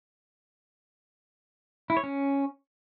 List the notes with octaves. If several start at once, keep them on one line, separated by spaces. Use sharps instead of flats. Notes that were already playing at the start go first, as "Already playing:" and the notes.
E4
C#5
C#4